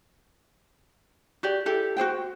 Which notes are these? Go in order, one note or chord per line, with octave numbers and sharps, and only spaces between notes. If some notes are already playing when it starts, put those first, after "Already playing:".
F#4 G4 D5
E4 G4 A4
F#4 G#4 C5 G5